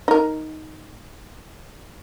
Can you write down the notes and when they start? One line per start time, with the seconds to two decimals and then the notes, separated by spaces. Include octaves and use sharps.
0.08 D#4 A#4